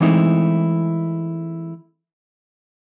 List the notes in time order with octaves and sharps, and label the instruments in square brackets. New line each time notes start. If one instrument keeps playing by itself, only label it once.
[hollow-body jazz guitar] E3 G#3 A3 C4 D#4 E4